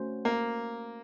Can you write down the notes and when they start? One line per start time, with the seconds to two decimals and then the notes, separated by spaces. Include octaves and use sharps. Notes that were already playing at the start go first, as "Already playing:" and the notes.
Already playing: A3 C#4 F#4 C5
0.25 A#3